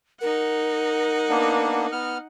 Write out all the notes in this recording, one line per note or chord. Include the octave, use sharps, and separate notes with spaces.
D#4 A#4 F#5
A#3 B3 D4
B3 F6